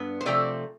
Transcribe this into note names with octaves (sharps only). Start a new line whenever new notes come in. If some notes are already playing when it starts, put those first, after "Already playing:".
Already playing: G2 B3
C5
C3 F3 A3 C4 D5